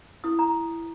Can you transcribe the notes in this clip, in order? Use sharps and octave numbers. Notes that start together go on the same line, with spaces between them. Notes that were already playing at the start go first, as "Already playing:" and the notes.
E4 D#6
A#5